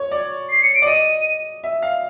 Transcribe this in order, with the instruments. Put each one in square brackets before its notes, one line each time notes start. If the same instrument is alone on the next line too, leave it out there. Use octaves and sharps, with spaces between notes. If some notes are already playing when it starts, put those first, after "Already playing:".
Already playing: [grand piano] C#5
D5
[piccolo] C7
C#7
D7
[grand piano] D5
[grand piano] D#5 [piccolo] D#7
[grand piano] E5
F5